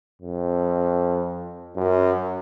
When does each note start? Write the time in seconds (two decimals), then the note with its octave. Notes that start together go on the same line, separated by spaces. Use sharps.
0.22 F2
1.76 F#2